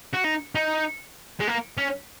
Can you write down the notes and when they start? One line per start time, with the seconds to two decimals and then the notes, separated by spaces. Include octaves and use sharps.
0.13 F#4
0.24 D#4
0.55 D#4
1.40 G#3
1.47 A#3
1.78 C#4